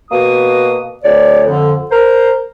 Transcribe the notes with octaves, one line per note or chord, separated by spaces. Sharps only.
B2 A#3 F#4 D#6
D2 C#5 D5
F2 D3
A#4 C5